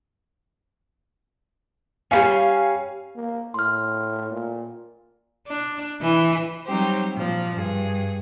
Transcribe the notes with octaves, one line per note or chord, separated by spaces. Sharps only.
G3 B3 C#4 F5 G#5
A#3
A2 C6 F6
A#2
D4
E3
F#3 G3 C4 D#4 G4 C5
A#2 F3
G2 G#4